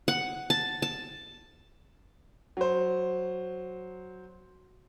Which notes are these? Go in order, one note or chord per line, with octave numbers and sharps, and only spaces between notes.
F#5
A5
A5
F#3 C5